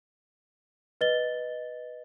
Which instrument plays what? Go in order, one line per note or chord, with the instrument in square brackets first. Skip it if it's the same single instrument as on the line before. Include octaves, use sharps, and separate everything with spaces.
[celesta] B4 D#5 A6 G7